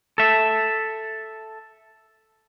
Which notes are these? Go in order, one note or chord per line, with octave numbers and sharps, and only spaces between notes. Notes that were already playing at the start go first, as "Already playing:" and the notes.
A4 E5